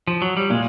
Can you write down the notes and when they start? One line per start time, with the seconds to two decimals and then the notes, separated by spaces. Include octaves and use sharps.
0.07 F3
0.22 F#3
0.37 G3
0.50 A#2 G#3